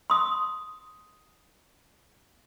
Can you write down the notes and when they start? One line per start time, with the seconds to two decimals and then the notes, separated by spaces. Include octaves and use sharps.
0.10 C6 D#6